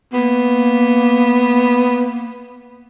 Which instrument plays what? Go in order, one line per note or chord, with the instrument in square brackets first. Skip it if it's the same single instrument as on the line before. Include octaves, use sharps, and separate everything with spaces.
[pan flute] A#3 [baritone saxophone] B3